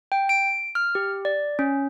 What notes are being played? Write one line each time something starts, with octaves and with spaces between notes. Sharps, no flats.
G5
D7
F6
G4
D5
C#4